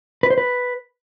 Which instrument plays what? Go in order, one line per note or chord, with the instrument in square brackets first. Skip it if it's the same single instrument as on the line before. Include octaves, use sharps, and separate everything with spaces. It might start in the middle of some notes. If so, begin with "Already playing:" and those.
[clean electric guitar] B4
C5
B4